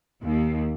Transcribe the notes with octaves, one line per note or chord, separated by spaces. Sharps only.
D#2